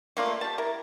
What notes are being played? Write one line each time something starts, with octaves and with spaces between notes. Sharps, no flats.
A3 A#3 F4 D5
G4 A5
E4 A#4